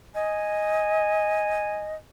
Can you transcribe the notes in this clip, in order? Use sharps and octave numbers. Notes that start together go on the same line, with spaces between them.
D#5 G#5